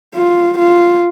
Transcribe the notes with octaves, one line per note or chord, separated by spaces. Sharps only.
F4
F4